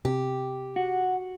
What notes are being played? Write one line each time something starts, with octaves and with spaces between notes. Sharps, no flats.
C3 G4
F#4 F#5